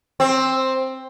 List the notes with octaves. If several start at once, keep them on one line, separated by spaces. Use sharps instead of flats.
C4